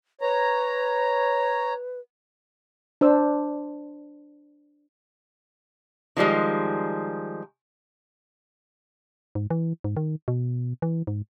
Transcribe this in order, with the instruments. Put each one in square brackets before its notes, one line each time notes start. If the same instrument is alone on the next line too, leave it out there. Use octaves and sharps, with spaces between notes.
[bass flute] B4 [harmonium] C#5 A#5
[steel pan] D4 C5 E6
[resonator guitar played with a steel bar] D#3 F3 G3 G#3
[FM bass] G#2
E3
G#2
D#3
B2
E3
G#2